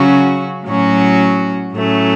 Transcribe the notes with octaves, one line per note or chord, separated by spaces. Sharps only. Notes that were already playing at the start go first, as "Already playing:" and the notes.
Already playing: C#3 F#3 C#4 F#4
A2 F#3 C#4 F#4
A2 F#3 A3 C#4